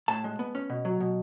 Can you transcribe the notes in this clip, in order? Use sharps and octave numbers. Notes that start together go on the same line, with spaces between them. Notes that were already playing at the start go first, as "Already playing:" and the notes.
A2 A5
G#3
B3
C#4
B2
F#3
B2